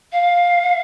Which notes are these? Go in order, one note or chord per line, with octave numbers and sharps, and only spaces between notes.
F5